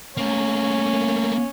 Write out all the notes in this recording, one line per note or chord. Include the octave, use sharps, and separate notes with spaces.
A3 A#3 C#4